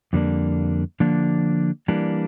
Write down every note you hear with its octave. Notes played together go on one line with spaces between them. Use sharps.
F2 D3 G3 A#3 D4
D3 F3 A#3 D4
E3 G3 A#3 D4